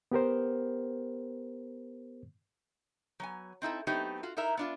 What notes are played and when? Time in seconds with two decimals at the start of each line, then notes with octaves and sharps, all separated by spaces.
0.12 B3 G4 A#4 C5
3.20 F#3 B3 G#5
3.62 C4 D#4 E4 A4
3.87 F#3 A3 B3 C4 D#4 G4
4.23 F4 F#4
4.37 D#4 E4 A#4 E5
4.57 B3 D4 F4